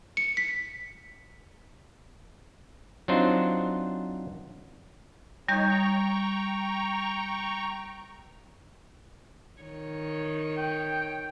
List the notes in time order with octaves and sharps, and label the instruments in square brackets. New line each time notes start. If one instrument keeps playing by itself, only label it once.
[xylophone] C#7
B6
[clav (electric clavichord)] F#3 C4 D4 D#4 F4 C5
[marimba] G3 G6 [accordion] D#4 C#5
[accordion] G5 A#5 C#6
[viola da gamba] D#3 C#5
[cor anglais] G5